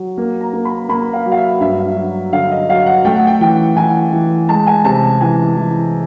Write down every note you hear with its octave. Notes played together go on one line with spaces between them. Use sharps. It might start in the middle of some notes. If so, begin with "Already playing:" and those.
Already playing: F#3
A#3
A#5
A#3
B5
A#3 B5
F5
F#3
F5
E5
G2 E5
F#3
D3 F5
D#5
F#3 F5
F#5
A3 G5
F#5
G5
E3 G5
E3 G#5
E3
G#3 A5
G#5
C3 A5
E3 G#5
E3